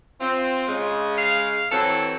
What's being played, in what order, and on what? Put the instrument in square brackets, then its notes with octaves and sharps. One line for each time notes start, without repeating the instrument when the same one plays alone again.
[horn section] C4 [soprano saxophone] F4
[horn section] C#3 G#3
[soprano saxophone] F5
[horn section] E3 F#3 C4 [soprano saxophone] A4